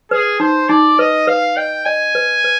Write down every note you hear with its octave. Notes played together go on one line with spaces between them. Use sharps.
G#4 B4
D#4 C5
D#4 D5
B4 D#5
B4 F5
D#5 G5
D#5 G#5
B4
B4